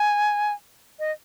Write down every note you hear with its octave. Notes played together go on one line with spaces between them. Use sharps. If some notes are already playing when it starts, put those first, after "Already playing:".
Already playing: G#5
D#5